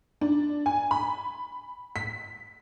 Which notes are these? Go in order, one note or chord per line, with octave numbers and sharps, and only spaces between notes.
D4
G#5
B5
B6